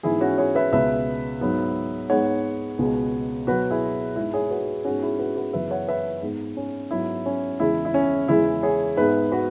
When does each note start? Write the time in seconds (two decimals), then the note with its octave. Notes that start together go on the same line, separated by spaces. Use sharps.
0.03 G#2 E3 B3 E4 G#4
0.21 C#4 F#4
0.38 G#4 C#5
0.55 B4 E5
0.72 C#2 B2 G#3 B3 B4 E5
1.41 G#2 F#3 B3
2.10 G#2 G#3 B3 C#5 F#5
2.79 C#2 B2 G#3 B3
3.47 B2 F#3 B3 F#4 B4
3.70 E4 G#4
4.16 G#2 G#3 B3 E4
4.33 G#4 C#5
4.51 F#4 B4
4.85 G#2 G#3 B3 C#4 F#4
5.02 E4 G#4
5.19 F#4 B4
5.36 F#4 B4
5.53 F#2 C#3 E3 B3 B4 E5
5.71 C#5 F#5
5.88 B4 E5
6.22 G#2 G#3 B3
6.57 C#4
6.91 G#2 F#3 B3 E4
7.26 C#4
7.60 E2 C#3 G#3 E4
7.85 E4
7.94 C#4
8.28 E2 C#3 E3 G#3 E4
8.63 G#4 C#5
8.97 G#2 G#3 B3 B4 E5
9.32 F#4 B4